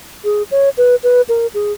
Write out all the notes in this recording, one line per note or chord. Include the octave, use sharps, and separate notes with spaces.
G#4
C#5
B4
B4
A#4
G#4